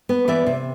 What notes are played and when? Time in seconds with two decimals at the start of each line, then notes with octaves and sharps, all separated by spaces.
0.09 B3
0.28 E3 D5 E5
0.46 C3